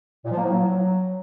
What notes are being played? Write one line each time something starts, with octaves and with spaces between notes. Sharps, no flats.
A#2
F3
A#3
A2
F#3